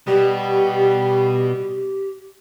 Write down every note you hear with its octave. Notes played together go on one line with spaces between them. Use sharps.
B2 G3 G4